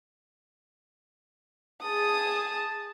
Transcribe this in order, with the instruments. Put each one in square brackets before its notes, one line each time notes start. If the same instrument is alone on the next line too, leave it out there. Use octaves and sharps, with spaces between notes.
[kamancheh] G#4 D#6 [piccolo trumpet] A5